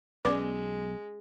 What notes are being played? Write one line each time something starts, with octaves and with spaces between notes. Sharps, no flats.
B1 G#3 B3 C#4 D5 D6